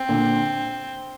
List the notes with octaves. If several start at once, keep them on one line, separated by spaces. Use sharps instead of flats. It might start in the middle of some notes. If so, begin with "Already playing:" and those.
Already playing: C4
A#2 D3